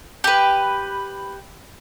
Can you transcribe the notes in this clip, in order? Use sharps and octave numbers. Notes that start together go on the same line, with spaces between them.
G4 B4